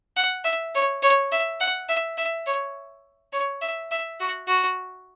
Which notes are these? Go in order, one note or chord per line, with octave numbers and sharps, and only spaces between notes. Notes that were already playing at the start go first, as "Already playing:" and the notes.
F#5
E5
C#5
C#5
E5
F#5
E5
E5
C#5
C#5
E5
E5
F#4
F#4